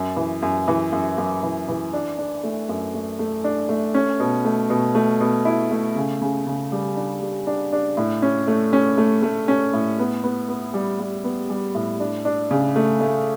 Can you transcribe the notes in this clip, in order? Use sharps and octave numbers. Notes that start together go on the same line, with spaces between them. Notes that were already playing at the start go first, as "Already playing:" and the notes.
Already playing: F#2
E3
F#2
E3
F#2
F#2
E3
E3
D4
D4
A3
F#2
A3
A3
D4
A3
C#4
B2
A3
B2
A3
B2
E4
A3
C#3
C#3
C#3
G3
D4
G3
D4
D4
A2
C#4
A3
C#4
A3
A3
C#4
A2
B3
B3
B3
G3
G3
B3
G3
A2
D4
D4
C#3
A3
A3